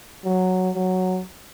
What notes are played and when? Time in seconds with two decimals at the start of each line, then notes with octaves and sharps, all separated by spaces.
0.24 F#3
0.75 F#3